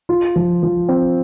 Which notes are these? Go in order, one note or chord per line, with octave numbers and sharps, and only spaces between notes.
F4
F3
F3
C4